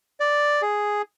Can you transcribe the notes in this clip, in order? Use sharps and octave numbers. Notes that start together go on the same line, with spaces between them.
D5
G#4